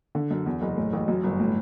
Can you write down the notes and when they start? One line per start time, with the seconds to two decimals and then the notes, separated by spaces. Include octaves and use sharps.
0.15 D3
0.31 F#2
0.46 E2
0.61 F#1
0.77 A2
0.93 A1
1.08 F#2
1.23 G1
1.39 A2